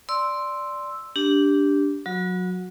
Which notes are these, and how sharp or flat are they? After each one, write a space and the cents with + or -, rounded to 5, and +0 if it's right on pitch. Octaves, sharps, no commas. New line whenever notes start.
D5 +0 C6 +0 E6 +0
D4 -10 G4 +0
F#3 -25 F#4 -25